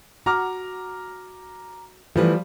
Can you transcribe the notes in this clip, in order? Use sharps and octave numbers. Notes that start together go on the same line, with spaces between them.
F#4 A#5 D6 F6
E3 F3 G3 A3